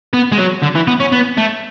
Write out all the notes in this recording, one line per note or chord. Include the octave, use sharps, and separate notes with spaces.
B3
G#3
F#3
D3
E3
B3
C#4
B3
A3